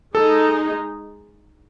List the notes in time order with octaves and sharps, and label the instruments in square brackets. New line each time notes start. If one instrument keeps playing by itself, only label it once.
[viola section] G#3 D#4 G#4 [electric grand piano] A4